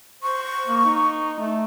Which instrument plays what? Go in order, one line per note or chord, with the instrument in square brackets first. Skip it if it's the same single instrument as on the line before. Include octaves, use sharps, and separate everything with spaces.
[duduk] C5 [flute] C#6
[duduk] A#3
D#4
A3